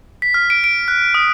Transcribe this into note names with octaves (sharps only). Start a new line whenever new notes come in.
B6
F6
D7
D7
F#6
D#6